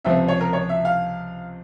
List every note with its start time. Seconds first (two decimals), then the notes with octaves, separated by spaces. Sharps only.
0.05 C#2 C3 F3 C4 E5
0.28 C#5
0.41 A#4
0.53 C#5
0.69 E5
0.85 F5